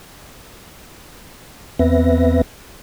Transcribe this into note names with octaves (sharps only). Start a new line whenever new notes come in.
E2 B3 C4 B4 E5 A#6